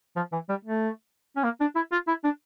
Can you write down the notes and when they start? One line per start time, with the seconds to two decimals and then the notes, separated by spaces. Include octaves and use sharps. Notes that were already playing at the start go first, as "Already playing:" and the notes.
0.16 F3
0.32 E3
0.49 G3
0.65 A3
1.36 C#4
1.44 A#3
1.60 D4
1.75 E4
1.92 F4
2.08 E4
2.24 D4